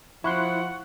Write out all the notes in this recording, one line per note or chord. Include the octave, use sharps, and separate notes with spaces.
F3 E4 F#5 C6 C#6 F#6